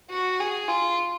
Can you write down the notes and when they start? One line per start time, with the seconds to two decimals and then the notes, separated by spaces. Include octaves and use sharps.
0.10 F#4
0.39 G#4
0.68 F4